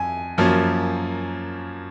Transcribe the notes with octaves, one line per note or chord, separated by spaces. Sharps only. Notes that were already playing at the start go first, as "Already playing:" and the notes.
Already playing: F2 G#5
F#2 F3 A#3 C#4